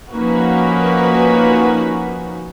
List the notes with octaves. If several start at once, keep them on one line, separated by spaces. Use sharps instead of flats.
F3 A#3 C#4 D#4 F#4 B4